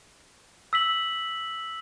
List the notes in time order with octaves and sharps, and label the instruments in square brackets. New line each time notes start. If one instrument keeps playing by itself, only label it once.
[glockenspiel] E6 B6 F#7